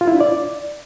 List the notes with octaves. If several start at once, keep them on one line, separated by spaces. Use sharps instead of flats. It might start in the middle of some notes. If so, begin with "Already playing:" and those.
F4
E4
D4
D5